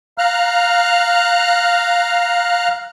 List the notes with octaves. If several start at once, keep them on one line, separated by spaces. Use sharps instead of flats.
F5 A#5 F6 F#6